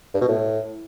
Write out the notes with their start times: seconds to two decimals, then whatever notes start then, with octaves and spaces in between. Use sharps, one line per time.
0.14 G2
0.21 B2
0.28 A2